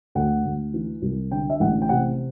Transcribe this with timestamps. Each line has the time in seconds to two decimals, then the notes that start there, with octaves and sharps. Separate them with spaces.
0.15 D2 F#5
0.44 D2
0.74 E3
1.02 C2
1.31 D3 G5
1.50 E5
1.60 A1 F#5
1.82 G5
1.89 C3 F#5